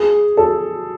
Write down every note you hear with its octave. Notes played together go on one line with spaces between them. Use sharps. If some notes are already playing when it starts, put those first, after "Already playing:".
Already playing: G#4
A4